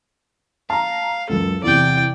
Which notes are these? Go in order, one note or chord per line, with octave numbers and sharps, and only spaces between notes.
F5 A5 A#5
C#2 F#2 A4
E2 C3 D5 G5